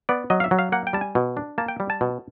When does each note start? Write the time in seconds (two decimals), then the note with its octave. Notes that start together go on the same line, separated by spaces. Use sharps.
0.09 B3 D5
0.30 F#3 D#5
0.40 F5
0.44 E5
0.51 F#3
0.59 F5
0.72 A#3 F#5
0.87 G5
0.93 G3 A5
1.01 G#5
1.15 B2
1.37 D4
1.58 A#3 A5
1.68 G5
1.80 G3
1.90 A5
2.01 B2